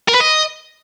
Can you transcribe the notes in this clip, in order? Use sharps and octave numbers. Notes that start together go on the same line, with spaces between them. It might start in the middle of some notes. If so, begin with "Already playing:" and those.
A#4
B4
D#5